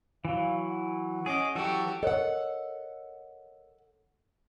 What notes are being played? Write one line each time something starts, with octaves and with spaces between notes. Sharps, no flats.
E3 F#3 F5
F#5
C#4 G#4 D#5 D6
E3 F#3 F#4 G4 A4
A4 A#4 C#5 D#5 F#5